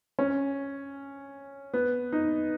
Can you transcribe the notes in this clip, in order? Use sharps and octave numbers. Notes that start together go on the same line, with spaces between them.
C#4
B3
D#4